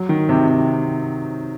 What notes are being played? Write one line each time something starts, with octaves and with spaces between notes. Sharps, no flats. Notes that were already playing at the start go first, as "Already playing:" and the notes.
Already playing: F#3
D#3
C3
C3